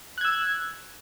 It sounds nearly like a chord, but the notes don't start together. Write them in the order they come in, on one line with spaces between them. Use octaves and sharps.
F#6 G#6 E6